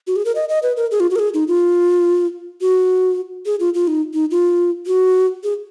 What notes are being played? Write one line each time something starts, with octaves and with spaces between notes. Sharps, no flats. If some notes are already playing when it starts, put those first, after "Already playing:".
F#4
G#4
A#4
D#5
D#5
B4
A#4
G#4
F4
F#4
A#4
G#4
D#4
F4
F#4
G#4
F4
F4
D#4
D#4
F4
F#4
G#4